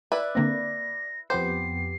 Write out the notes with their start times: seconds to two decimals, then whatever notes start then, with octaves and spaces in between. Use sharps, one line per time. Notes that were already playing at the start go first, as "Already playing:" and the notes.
0.12 E4 B4 D5
0.35 D3 A#3 C4 A#6
1.30 F2 B3 G4 C5 G6 C7